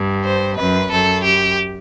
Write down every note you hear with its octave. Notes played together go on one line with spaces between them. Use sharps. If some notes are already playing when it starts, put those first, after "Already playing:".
Already playing: G2
C5
F#2 B4
F#2 A4
G4